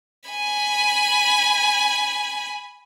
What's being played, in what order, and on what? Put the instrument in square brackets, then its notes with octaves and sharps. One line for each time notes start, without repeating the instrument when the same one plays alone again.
[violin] G#5 B5